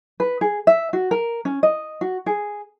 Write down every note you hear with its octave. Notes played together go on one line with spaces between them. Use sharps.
B4
G#4
E5
F#4
A#4
C#4
D#5
F#4
G#4